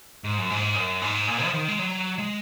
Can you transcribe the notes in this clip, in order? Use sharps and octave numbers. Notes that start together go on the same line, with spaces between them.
G#2
F#2
G#2
F#2
G#2
A#2
F3
D#3
G#3
F#3
G#3